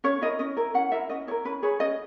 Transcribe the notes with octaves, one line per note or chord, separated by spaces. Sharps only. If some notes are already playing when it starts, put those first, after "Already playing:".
C#4 C#5
E4 A#4 D#5
C#4 D#5
E4 A#4
C#4 F#5
E4 A#4 E5
C#4 D#5
E4 A#4 C#5
C#4 B4
G#4 B4 C#5
C#4 D#5